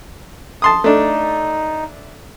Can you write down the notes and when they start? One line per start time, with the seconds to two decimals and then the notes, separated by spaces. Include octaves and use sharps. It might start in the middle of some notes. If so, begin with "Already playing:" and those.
0.62 A5 C6 D#6
0.84 A3 D4 D#4